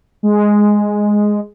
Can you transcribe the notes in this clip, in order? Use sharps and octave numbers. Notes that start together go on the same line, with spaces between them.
G#3